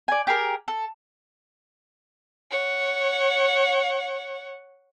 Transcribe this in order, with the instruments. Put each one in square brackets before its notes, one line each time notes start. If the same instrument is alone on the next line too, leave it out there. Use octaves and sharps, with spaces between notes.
[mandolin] D5 G#5
G4 G#4 A#4
A4
[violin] C#5 F#5